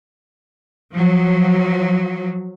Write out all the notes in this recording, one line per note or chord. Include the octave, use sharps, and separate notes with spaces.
F3 F#3